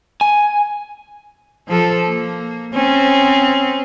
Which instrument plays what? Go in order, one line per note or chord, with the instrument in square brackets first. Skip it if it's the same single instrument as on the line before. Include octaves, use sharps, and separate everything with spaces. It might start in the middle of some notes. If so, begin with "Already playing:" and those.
[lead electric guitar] G#5
[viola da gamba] F3 A4
A#3
C4 C#4